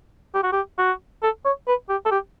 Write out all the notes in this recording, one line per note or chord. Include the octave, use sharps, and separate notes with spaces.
G4
F#4
G4
F#4
A4
C#5
B4
G4
A4
G4